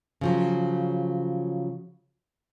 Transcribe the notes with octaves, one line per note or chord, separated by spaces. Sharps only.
C#3 F3 F#3